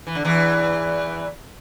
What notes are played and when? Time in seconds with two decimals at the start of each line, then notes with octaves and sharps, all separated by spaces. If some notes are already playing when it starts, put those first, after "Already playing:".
0.07 E3
0.15 D3
0.25 E2 E3